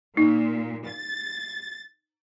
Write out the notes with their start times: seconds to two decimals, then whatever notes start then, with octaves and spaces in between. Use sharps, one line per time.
0.17 A#2 D#4
0.88 A6